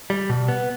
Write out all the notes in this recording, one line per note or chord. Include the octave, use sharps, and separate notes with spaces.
G3
B2
B3